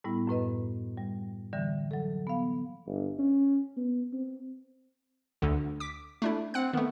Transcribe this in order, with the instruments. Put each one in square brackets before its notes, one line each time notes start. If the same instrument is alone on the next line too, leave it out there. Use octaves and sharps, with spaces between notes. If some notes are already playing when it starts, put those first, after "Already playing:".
[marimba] A2 G3 B3 E4
F#2 A2 B4 D#5
G3
D3 E3 G3
F#3 A4
B3 F5
[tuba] G1
C#4
B3
C4
[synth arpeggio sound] D2 D3
D6 B6
A3 D4 E4
[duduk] C4 [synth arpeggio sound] F#5 F#6
[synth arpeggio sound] D#3 A3 [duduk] B3